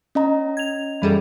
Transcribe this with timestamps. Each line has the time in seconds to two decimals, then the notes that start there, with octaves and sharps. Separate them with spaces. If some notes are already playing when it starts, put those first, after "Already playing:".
0.15 C#4 D#5 A#5
0.57 G#6 F7
1.02 F#2 E3 G3 G#4 A4